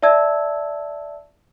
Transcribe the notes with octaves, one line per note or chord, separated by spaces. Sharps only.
D5 E5 A5 E6 G#6